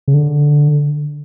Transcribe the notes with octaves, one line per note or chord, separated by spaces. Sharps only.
C#3
D3